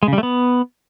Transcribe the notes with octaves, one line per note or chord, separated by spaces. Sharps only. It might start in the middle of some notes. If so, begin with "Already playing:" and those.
G#3
C#3
G3
A3
B3